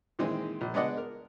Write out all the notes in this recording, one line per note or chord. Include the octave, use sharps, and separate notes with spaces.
A#2 D#3 E3 G#3 C4
A#1
G#3 B3 D4 D5 D#5 F#5
A#4